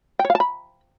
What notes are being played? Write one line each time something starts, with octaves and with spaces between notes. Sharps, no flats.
G5
C#5
F5
A5
B5